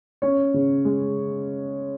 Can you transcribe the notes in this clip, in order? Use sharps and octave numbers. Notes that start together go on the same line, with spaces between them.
C#4 C#5
C#3
G#3